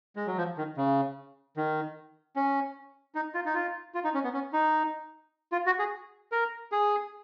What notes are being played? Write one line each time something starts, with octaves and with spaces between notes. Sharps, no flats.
G#3
F#3
F3
D#3
C#3
D#3
C#4
D#4
F4
D#4
F4
F4
D#4
C#4
B3
C#4
D#4
F4
F#4
G#4
A#4
G#4